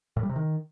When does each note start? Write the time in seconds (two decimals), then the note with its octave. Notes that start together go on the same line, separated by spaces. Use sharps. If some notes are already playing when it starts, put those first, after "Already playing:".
0.17 A2
0.23 G3
0.29 C3
0.36 D#3